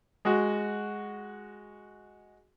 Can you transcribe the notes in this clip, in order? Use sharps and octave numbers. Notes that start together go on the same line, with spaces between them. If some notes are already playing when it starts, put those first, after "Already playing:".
G#3 F#4